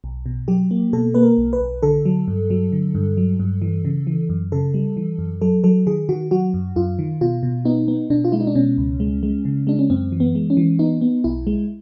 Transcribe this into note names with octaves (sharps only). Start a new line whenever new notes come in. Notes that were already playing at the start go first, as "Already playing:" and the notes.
B1
B2
F#3 G4
A#3
B2 A4
A#3 B4
A#4
B1
B4
B1
D3 A4
F#3
G2
F#3
D3
G2
F#3
G2
E3
C#3
E3
F#2
C#3 A4
G3
E3
F#2
F#3 A4
F#3 A4
D#3 G#4
D#3 F#4
F#3 F#4
F#2
F#2 F4
D#3
B2 F4
B2
B3 D#4
B3
B2 D4
F4
G#3 E4
D#4
D4
B2 C#4
C#2
G#3
G#3
C#3
G#3 D4
C#4
F#2 C4
E3
B3
G#3
C#4
E3
B3 D#4
B3
B1 E4
G#3